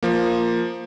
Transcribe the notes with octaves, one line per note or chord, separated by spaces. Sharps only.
F3 A#3